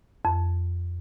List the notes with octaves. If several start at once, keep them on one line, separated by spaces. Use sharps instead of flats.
F2